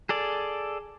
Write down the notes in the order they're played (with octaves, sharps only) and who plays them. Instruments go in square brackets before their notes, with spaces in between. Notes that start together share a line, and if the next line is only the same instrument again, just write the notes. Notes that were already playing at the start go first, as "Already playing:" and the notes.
[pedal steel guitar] G#4 A4 D5